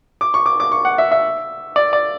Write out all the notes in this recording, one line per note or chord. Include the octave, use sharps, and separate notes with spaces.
D6
C#6
D6
D6
C#6
F#5
E5
E5
D5
D5